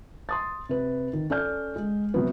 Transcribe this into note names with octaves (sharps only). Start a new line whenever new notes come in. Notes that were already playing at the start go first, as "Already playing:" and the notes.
C6 D#6 A6
C3 B4
D#3
C#4 A4 D5 F6 G6
G#3
C3 F#3 B3